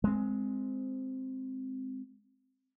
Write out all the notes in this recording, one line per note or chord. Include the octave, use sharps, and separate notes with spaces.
G#3 C4